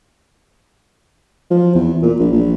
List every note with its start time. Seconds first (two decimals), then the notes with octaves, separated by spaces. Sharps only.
1.50 F3
1.75 E2
2.02 A#2
2.19 A#1
2.33 A#1